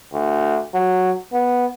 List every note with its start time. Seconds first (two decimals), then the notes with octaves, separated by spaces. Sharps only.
0.13 D2
0.74 F#3
1.34 B3